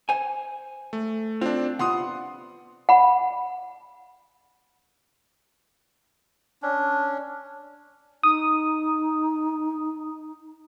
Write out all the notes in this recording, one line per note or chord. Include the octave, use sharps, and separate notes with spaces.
C5 G#5
A3
C4 D4 F4
C3 B3 F4 F#5 C6 D#6
F#5 B5
C#4 D4
D#4 D#6